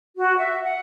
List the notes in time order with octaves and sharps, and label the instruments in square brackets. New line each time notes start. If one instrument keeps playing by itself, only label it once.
[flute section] F#4
E5
F#5